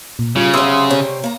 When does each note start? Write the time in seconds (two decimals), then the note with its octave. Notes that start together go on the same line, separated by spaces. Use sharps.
0.19 A#2
0.36 C#3 G3 F4
0.54 C3 F#3 C6 D#6 E6
0.91 C3 G3 C5 C#5
1.24 A#3 A#5